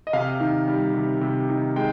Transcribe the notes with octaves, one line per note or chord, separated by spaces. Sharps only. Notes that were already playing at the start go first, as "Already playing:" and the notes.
D#5
C3 F5
D#3
G3
C3
C3
D#3
G#3 G5